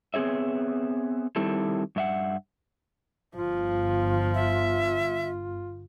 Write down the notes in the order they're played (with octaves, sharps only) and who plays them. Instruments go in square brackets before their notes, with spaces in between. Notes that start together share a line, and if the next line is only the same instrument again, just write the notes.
[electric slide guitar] B3 C4 G#4 C#5 E5
D#3 G3 C4 E4 A4
G2 E5 F#5
[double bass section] G1 [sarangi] F3 [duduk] F4
[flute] E5